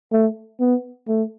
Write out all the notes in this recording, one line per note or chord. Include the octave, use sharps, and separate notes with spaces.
A3
B3
A3